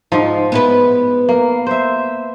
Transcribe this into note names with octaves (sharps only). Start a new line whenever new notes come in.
G#2 F3 D#4
B3 E4 B4
A#3
C5 E5